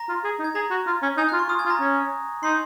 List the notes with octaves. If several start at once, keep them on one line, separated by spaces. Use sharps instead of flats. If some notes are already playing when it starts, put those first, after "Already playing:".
Already playing: A#5 A#6
F4
G#4
D#4
G#6
G#4 A#5 A#6
F#4
F4
C#4
D#4 G#5 G#6
F#6
F4
C#6
F4 D#6
G#5 G#6
F4
A#5 A#6
C#4
D#4 C6 C7